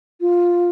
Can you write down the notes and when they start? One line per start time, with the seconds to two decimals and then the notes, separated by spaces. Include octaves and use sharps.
0.21 F4